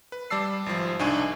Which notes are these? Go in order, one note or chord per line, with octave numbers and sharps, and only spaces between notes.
B4
G3 D5 A5 E6 C7
G#1 F3
C2 D4 D#4 G#5 C#6